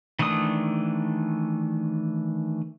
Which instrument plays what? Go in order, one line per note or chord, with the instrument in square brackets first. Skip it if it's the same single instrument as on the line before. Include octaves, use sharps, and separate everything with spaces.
[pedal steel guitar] D#3 E3 A3 D4 D#6